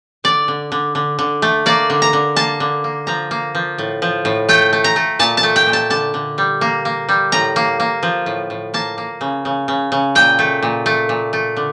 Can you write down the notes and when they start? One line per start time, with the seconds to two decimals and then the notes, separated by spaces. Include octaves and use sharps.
0.24 D3 D5
0.48 D3
0.72 D3
0.95 D3
1.19 D3
1.42 A3
1.66 A#3 D5
1.90 D3
2.02 A#5
2.13 D3
2.36 A#3 A5
2.60 D3
2.84 A#3
3.07 F3 A#5
3.31 A#3
3.55 F3
3.78 A2
4.02 F3
4.25 A2
4.49 A3 G5
4.73 A3
4.84 A#5
4.96 A3
5.19 A#2 A5
5.37 A5
5.43 A3
5.56 G5
5.67 A#2
5.73 A5
5.90 D3 A5
6.14 D3
6.38 G3
6.61 A#3
6.85 A#3
7.09 G3
7.32 A2 A#5
7.56 A#3
7.80 A#3
8.03 F3
8.26 A2
8.50 A2
8.74 A#3 A5
8.98 A#3
9.21 C#3
9.45 C#3
9.68 C#3
9.92 C#3
10.15 A#2 G5
10.39 A3
10.62 A#2
10.86 A3
11.09 A#2
11.33 A3
11.57 D3